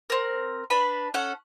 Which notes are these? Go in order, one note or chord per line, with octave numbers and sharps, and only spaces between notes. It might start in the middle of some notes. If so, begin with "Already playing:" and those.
C4 A#4
D4 B4 B5
C#4 A4 F#5